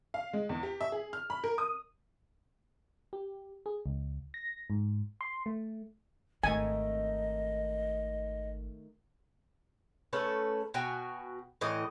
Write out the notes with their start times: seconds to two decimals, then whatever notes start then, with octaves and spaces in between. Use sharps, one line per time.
0.14 F5
0.33 G#3
0.49 E2
0.63 G4
0.81 E5
0.92 G#4
1.13 F6
1.30 B5
1.44 A#4
1.58 D#6
3.13 G4
3.66 G#4
3.86 C#2
4.34 A#6
4.70 G#2
5.21 C6
5.46 A3
6.43 G#1 D#3 A3 C4 D#5 G#5
10.13 A3 C#4 A4 B4
10.74 B2 F#4 G5 G#5
11.61 A2 E3 D#5